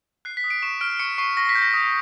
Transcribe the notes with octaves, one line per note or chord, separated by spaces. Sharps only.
F#6 C7
B6
D#6
D7
C#6 E7
F6 D7
C#6 C#7
C#6 C7
C#6 A#6
B6
G6
A#6
D#6